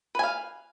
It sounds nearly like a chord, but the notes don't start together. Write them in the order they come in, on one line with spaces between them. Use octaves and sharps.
B4 G#5 F5